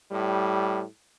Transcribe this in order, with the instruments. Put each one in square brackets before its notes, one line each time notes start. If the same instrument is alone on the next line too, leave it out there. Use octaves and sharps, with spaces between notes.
[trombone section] A2 G3